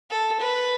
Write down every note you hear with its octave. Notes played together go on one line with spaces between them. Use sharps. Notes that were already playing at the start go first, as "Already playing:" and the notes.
A4
B4